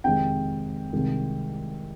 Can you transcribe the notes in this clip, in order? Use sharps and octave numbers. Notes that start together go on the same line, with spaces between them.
F2 C3 D#3 G#3 G5
C2 C3 D#3 G#3